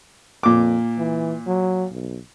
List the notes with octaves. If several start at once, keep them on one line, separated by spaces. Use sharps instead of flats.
F2 A#2 D6
E3
F#3
B1